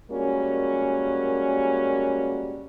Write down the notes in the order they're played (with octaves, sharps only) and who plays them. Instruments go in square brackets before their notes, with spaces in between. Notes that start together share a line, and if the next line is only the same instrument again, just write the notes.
[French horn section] G3 G#3 A#3 C#4 F#4 A#4